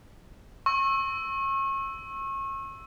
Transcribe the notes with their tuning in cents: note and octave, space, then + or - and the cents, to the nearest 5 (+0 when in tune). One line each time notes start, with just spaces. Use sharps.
C#6 -35 E6 +0